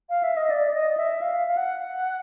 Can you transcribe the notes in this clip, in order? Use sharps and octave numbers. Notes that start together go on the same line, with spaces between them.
F5
E5
D#5
D5
D5
D#5
E5
F5
F5
F#5